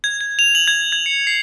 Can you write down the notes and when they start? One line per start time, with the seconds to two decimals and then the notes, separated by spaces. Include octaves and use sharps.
0.04 G#6
0.21 G#6
0.39 F7
0.55 F#7
0.68 G#6
0.92 G#6
1.06 C#7
1.27 C7